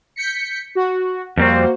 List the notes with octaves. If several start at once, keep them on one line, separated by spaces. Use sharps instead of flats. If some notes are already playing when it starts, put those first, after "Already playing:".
G6 B6 C#7
F#4
F2 G3 A#3 C4 F#4 C5